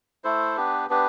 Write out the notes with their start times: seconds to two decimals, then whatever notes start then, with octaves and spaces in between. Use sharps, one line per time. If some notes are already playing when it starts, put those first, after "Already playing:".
0.24 A3 E4 A4 C5
0.57 B3 D4 G4 B4
0.90 B3 D4 G4 B4